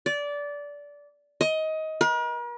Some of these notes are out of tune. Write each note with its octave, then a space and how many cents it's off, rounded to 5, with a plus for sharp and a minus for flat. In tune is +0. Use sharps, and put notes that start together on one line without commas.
D5 -20
D#5 +20
A#4 +45